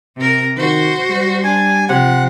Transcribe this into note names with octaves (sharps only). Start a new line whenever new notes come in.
C3 A#4
D#3 F#4 C5
G3
D4 G#5
C3 F3 F#5